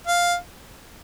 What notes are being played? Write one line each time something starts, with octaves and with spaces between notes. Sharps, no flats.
F5